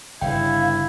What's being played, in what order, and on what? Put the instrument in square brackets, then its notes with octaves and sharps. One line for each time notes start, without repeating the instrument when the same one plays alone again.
[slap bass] G1 C#3 [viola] E4 [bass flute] F5 [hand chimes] G5